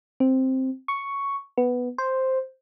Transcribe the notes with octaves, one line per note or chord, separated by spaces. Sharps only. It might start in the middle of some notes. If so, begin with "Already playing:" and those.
C4
C#6
B3
C5